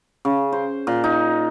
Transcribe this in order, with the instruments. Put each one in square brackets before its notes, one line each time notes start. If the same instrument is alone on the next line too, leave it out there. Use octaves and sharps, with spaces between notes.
[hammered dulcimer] C#3
C5
A#2
D#4